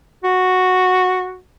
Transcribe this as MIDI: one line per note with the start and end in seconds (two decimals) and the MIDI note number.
0.24 1.38 66